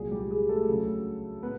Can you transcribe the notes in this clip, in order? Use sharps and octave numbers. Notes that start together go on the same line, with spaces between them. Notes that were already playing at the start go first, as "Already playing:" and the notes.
Already playing: C2 A#2 F#3 G#3 G#4
G3 G4
G#3 G#4
A3 A4
D2 C#3 F#3
A2 B3 B4